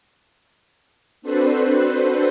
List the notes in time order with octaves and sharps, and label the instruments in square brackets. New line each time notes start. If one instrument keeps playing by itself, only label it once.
[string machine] C4 D4 F#4 A4 B4 C5